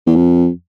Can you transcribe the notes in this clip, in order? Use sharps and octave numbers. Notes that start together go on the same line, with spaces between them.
E2
F2